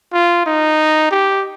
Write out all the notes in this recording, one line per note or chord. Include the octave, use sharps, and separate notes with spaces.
F4
D#4
G4